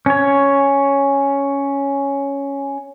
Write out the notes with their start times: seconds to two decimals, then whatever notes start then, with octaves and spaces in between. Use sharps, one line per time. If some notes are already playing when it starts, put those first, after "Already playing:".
0.06 C#4 C#5